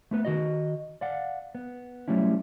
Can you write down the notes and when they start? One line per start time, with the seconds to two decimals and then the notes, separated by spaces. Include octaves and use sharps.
0.11 A3 B3 B4
0.25 D#3 F#4 D#5
1.01 D5 F5 F#5
1.55 B3
2.08 F#3 G3 A3 C#4 E4